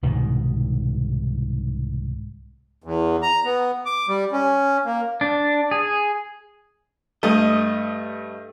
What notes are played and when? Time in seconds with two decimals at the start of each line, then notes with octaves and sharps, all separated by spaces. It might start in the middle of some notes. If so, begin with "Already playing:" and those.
0.03 C2 G#2 B2 D#3
2.84 E2
3.23 A#5
3.45 B3
3.86 D6
4.08 G3
4.32 C#4
4.85 A#3
5.21 D4
5.71 G#4
7.23 G2 A3 D#5 D#6